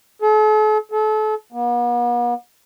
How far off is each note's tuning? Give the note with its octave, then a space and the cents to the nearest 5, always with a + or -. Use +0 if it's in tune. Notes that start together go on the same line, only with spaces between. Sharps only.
A4 -45
A4 -35
B3 -45